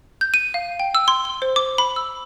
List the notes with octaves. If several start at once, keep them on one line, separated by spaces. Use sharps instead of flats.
G6
D#7
F5
G5
E6
C6
G7
C5
D6
B5
E6